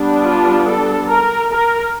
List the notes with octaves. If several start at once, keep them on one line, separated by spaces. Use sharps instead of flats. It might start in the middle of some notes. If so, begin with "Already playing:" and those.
Already playing: G3 B3 D4
F4
A4
A#4
A#4